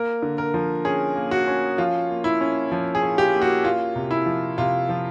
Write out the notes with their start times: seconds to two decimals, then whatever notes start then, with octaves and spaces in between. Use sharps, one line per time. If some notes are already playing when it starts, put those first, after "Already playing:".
Already playing: A#3 A#4
0.22 D3
0.38 A#4
0.54 F3
0.85 C#4 G#4
1.16 A#3
1.31 F#4
1.47 C#4
1.78 F3 F4
2.10 A#3
2.24 E4
2.41 C#4
2.72 F3
2.95 G#4
3.03 C#4
3.18 G4
3.34 A#3
3.41 F#4
3.65 A#3 F4
3.96 C3
4.11 E4
4.26 F3
4.58 C3 F4
4.89 F3